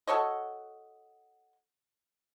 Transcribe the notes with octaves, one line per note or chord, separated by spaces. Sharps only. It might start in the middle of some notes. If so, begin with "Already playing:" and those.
F#4 A4 C#5 D#5